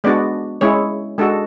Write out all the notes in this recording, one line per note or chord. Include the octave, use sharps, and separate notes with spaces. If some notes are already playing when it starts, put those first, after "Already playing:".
G#3 B3 D4 F#4 D5
G#3 C#4 E4 C#5
G#3 D4 F#4 A4